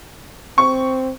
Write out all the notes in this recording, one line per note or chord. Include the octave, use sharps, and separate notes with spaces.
C4 C#6